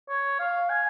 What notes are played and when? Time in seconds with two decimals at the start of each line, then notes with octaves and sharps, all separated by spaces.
0.09 C#5
0.40 F5
0.70 G#5